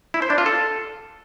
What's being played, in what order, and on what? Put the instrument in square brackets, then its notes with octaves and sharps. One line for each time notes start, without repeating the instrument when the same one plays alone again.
[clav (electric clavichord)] E4
C5
D4
F4
A4